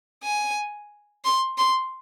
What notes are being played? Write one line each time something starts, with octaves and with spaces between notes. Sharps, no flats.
G#5
C6
C6